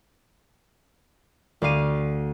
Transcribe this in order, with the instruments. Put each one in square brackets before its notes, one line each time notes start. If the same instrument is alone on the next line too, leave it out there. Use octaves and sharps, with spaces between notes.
[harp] D2 D5 F5 D#7